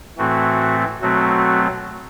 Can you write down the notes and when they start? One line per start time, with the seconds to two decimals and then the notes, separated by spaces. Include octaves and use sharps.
0.18 A2 E3 A3 C4 F#4
1.01 B2 F#3 A3 C4 F#4